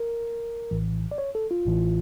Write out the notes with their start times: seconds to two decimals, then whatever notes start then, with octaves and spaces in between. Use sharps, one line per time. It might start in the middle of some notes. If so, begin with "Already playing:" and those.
Already playing: A#4
0.71 A#1 A2 E3
1.11 D5
1.18 C#5
1.35 A4
1.51 F4
1.65 A1 A2 E3